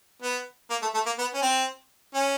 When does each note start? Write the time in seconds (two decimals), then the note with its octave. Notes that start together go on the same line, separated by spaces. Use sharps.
0.22 B3
0.70 A#3
0.82 A3
0.94 A3
1.06 A#3
1.18 B3
1.34 C#4
1.42 C4
2.14 C#4